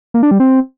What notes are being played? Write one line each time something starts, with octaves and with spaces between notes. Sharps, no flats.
A#3
D4
G3
C4